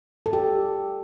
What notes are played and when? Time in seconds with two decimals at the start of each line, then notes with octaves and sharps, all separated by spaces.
0.26 A4
0.33 G4